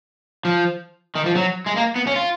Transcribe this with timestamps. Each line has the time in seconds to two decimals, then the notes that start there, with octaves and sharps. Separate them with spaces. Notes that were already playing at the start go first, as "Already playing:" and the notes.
0.45 F3
1.15 D#3
1.26 F3
1.36 F#3
1.66 G#3
1.76 A#3
1.96 B3
2.07 C#4
2.16 F4